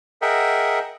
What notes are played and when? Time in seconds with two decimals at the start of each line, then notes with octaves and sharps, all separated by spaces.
0.22 G#4 A#4 D#5 E5 F#5 G5